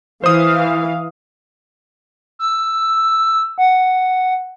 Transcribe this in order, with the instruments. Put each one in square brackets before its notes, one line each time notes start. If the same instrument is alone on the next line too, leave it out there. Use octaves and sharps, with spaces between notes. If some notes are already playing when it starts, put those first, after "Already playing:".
[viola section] E3 F5 [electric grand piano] C5 D#6
[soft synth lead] E6
F#5